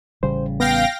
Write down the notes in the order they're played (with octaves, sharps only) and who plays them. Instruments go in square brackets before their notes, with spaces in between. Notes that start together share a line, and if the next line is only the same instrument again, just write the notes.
[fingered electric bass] A1 C#3 G3 [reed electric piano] C5
[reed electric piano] B3 [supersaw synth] F5 G5 A#6